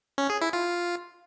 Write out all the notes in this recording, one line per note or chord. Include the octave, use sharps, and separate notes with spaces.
C#4
G#4
E4
F4